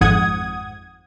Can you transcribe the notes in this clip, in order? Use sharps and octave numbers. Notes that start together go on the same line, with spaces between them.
G#1 F2 G#2 F#5 D#6 G#6